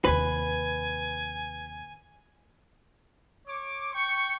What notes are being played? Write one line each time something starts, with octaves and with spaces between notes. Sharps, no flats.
D#2 C3 B4 G#5
C#5 D6
G5 C#6